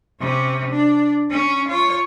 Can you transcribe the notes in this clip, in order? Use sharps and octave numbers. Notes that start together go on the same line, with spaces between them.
C3 C#4
D4
C#4
F4 C#5